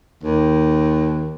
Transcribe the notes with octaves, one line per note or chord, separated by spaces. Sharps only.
D#2